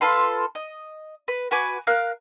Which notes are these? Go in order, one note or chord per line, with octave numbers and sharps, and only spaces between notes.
F4 A4 B4 C6
D#5
B4
F#4 B4 G#5 D6
A#4 F5 F6 F#6